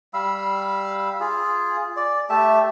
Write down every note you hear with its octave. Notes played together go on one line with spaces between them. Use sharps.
G3 F5 B5 E6
F4 G#4
D5
A3 G4 E5 A5